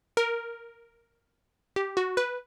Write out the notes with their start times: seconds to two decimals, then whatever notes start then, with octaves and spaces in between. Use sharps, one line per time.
0.17 A#4
1.76 G4
1.97 F#4
2.17 B4